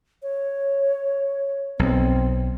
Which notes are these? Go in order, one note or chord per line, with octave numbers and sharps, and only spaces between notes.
C#5
B1 C4